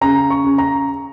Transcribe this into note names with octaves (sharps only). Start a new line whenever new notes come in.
C#3 A#5
C#6
C#3
A#5